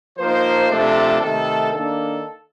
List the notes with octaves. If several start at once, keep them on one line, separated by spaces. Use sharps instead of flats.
F3 A#3 D#4 C5
C3 F3 A3 D4 A4
C3 D#3 A3 A4
D#3 A#3 D4 A4